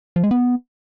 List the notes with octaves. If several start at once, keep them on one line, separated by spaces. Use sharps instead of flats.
F3
G#3
B3